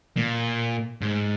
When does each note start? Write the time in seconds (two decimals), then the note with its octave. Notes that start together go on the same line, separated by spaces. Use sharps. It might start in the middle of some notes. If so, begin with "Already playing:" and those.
0.17 A#2
1.01 G#2